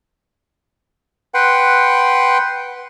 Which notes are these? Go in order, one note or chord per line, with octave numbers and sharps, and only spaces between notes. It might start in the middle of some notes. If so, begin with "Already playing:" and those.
B4 F#5 G5 C6